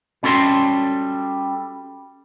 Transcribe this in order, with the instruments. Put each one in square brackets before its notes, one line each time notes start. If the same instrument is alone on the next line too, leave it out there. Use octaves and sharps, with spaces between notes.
[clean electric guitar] G3 C#4 F#4 A4 C6